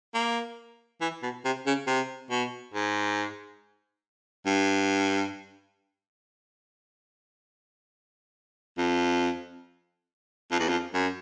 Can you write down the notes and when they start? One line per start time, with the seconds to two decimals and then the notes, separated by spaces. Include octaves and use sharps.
0.14 A#3
1.01 E3
1.23 B2
1.45 C3
1.66 C#3
1.87 C3
2.30 B2
2.74 G#2
4.46 G2
8.78 F2
10.51 F2
10.59 E2
10.68 F2
10.94 F#2